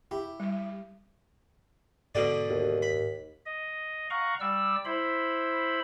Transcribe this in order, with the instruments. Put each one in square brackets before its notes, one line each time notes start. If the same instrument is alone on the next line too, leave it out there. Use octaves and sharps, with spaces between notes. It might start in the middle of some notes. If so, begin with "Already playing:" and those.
[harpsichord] E4 G4
[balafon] G3
[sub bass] G#2 [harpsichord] B2 D3 D5
[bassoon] D#2
[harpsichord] B5
[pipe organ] D#5
F5 F#5 A#5 C#6
G3 D5 E6
E4 C5 B5